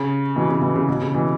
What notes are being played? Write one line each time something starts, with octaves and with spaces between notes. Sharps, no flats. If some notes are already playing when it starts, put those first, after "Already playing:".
Already playing: C#3
B2 E3
C#3
B2 E3
C#3
B2
C#3
B2 E3